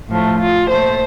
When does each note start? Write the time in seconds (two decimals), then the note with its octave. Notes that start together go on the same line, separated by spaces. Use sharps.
0.09 A2 F3 A3
0.40 F4
0.69 A#2 A3 C5